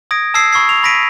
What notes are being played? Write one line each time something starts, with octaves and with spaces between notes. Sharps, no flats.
D#6 G#6 A#6 D7
A5 D#6 E6 G#6 C7
B5 C#6 E6 G#6 C7
C#6 F7
B5 A#6 B6 D7 D#7